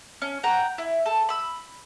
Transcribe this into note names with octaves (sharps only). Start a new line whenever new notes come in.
C#4
F#5 G5 A#5
E4
A4
B5 E6